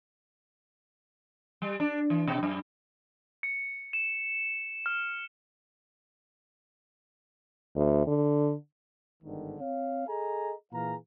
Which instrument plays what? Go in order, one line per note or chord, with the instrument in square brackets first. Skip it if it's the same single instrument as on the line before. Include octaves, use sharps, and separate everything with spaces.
[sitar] G3
D4
E3
B2
F#2
[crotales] C#7
E7
F6
[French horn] D2
D3
[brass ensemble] G1 G#2 D3 D#3
C4 C#5 F5
G#4 A4 D#5 G#5 A#5
A#2 E3 G#4 F5 A#5